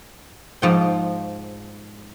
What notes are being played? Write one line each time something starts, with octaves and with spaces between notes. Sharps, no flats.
G#2 F3 G5